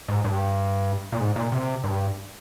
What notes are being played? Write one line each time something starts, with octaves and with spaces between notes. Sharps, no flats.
G#2
G2
A#2
G#2
A#2
C3
G2